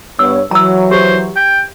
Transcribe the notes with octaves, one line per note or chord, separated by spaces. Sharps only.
G2 B3 C#5 E6
E3 F#3 A#5 E6
G4 C5
G5